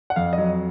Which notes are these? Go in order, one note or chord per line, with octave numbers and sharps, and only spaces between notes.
F#5
F2 F5
D#5
F#3